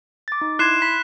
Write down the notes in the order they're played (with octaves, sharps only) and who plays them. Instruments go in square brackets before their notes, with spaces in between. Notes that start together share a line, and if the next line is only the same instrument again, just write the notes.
[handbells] D6 A6
D#4
[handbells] E4 C6 G#6 [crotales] F#6 C7 E7
[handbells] B5 [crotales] B6